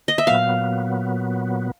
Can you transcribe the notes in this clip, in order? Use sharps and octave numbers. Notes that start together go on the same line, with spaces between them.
D#5
E5
A#2 F#3 B3 F5